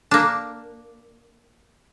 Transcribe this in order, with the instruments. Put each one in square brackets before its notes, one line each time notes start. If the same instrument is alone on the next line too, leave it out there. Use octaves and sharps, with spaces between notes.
[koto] A#3 D4